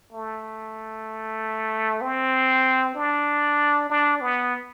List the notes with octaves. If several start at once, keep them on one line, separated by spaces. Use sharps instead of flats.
A3
C4
D4
D4
B3